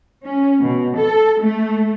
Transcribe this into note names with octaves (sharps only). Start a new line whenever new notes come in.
C#4
B2
A4
A3